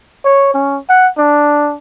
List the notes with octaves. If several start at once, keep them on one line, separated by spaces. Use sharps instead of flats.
C#5
C#4
F#5
D4